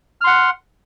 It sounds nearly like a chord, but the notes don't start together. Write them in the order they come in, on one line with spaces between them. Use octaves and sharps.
F6 C6 F#5